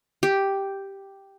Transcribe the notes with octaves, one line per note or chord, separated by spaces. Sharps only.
G4